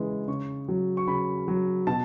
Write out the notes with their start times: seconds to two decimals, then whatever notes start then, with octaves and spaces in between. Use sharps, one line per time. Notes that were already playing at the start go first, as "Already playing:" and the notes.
Already playing: C#3 E3 G#3
0.28 C#3 C#6
0.68 F#3
0.97 C#6
1.07 C#3 B5
1.48 F#3
1.87 B2 A5